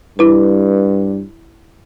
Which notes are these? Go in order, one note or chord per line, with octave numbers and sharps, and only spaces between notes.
G2 E4 B4